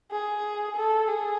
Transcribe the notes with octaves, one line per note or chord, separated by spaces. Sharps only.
G#4
A4
G#4